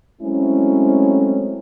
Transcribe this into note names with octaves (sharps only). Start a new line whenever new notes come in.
F#3 G#3 A3 C4 C#4 E4